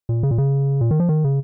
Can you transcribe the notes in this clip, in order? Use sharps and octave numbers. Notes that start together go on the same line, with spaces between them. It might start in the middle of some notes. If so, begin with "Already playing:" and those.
A#2
C#3
A#2
C#3
A#2
D#3
F3
D#3
C#3